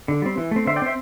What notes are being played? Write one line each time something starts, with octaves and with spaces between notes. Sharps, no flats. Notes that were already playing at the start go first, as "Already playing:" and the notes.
D3
G3 C4
E3
A3 C4
D3 C5 E5
D5 G5
C4 C5 E5